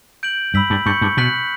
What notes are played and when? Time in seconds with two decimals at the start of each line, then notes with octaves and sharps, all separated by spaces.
0.23 G6 D7 F#7
0.54 G2 B5 E6 B6 F#7
0.70 G2
0.86 G2 C#6 G6 C#7 F#7
1.01 G2
1.17 B2 F#6 B6 F#7